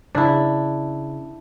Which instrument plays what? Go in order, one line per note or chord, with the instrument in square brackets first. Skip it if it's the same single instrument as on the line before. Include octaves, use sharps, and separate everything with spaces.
[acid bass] C#3 [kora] D4 E4